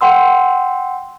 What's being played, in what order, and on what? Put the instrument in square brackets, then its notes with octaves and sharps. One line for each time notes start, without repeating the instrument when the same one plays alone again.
[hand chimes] F#5 G5 C6 E6